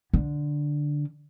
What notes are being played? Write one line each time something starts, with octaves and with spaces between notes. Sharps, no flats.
D3